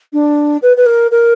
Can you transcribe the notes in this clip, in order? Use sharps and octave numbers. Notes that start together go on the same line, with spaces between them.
D4
B4
B4
A#4
A#4